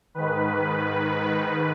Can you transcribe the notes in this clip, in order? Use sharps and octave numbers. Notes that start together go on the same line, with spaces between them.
G#2 D#3 B4